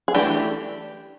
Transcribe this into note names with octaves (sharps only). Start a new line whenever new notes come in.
G#4
E3 A3 D4 G4